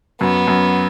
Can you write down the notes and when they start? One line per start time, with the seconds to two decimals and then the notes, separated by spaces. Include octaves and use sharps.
0.21 F#2 B3
0.48 F#2